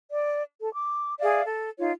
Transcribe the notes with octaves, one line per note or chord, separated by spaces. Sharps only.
D5
A4
D6
G#4 D5 E5 F5
A4
D#4 F4 C#5